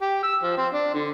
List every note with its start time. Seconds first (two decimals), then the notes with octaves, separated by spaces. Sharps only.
0.02 G4
0.23 E6
0.43 F3
0.58 C4
0.73 D4
0.94 D3